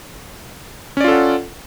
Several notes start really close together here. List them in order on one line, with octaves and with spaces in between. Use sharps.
C#4 D5 F4 A4 F#5